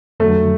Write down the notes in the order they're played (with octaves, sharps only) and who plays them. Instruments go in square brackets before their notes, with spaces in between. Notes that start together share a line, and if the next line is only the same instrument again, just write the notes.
[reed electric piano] F2 D3 F#3 [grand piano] A3